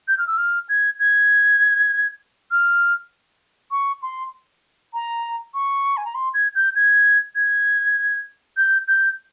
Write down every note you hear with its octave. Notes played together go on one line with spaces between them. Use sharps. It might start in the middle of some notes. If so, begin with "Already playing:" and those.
G6
F6
E6
F6
G#6
G#6
F6
C#6
C6
A#5
C#6
G#5
A#5
C6
G#6
G6
G#6
G#6
G6
G6